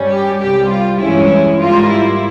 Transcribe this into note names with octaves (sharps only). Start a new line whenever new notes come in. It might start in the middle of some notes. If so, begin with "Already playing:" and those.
Already playing: G2 G3 C#4
G4
C2 C3 G3 G4
F4
G2 E3 G#3 C#4 E4
G#2 G3 A#3 F4
E4